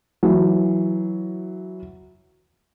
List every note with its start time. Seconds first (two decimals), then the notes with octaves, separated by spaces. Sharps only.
0.23 E3 F#3